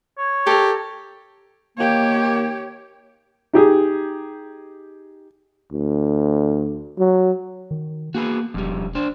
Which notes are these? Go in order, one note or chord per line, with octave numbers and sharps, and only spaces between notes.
C#5
G4 A4 A#4
D#3 A#3 G4 C#5
D#4 G4 G#4
D2
F#3
D#3
A#3 F#4 G#4 B4
E1 F2 G3
D4 C5